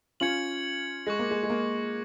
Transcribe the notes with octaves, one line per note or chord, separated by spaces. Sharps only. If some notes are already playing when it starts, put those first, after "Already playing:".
C#4 F4 G#6 C#7 F#7
G#3 C#6 F#6 A#6
A#3
G#3
G#3
A#3